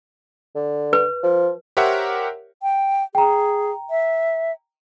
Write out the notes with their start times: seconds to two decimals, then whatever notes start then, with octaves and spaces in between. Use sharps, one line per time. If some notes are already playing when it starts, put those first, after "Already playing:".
0.55 D3
0.93 B4
1.23 F3
1.77 G4 A#4 C5 C#5 E5 F#5
2.63 G5
3.15 G#4 G5 A#5
3.90 E5